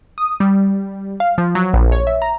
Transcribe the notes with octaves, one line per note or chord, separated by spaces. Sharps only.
D#6
G3
F5
F3
F#3
A#1
C#5
E5
A#5